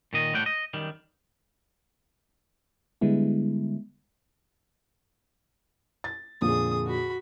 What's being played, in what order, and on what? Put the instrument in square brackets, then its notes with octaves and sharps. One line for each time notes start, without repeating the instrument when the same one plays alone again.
[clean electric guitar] A#2 D#3 D#5
A2 G3 A3 F#5 G5
D#5
F#2 D#3 G3
[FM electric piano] D3 G3 G#3 B3 E4
[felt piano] A6
[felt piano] F2 A#2 D3 [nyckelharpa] G#4 D#6
[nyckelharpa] F#4 B5